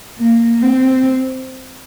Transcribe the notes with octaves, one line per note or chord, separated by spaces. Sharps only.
A#3
C4